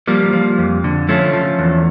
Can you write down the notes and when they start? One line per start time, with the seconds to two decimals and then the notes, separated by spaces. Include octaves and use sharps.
0.07 F3 G3 A#3
0.33 F3
0.58 F2
0.84 D3
1.09 F3 A3 C#4
1.33 F3
1.59 E2